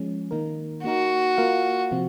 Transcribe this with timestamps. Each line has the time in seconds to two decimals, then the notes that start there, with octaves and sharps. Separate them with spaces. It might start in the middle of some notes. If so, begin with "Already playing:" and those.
Already playing: F3 G#3 C#4
0.31 D#3 A#3 D#4 A#4
0.84 A#3 D#4 F#4 A#4
1.38 A#3 F4 A#4 F5
1.91 C3 F3 C4 F#4